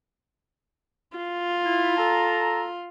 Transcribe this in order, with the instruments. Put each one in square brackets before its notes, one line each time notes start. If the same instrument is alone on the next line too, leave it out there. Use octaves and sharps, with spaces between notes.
[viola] F4
[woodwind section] E4
A4 A5 A#5